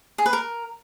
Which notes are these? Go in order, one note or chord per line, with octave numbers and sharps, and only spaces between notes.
G#4
B4
A#4